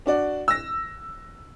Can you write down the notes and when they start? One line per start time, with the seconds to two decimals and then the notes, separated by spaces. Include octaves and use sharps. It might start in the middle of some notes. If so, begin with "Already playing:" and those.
0.06 D4 F#4 D5
0.48 E6 A#6